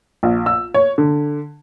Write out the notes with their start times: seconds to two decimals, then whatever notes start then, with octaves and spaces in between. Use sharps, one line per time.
0.23 A#1
0.46 E6
0.74 C#5
0.98 D3